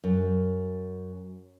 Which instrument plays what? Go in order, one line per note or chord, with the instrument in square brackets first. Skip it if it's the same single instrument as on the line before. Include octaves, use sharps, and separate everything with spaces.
[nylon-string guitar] F#2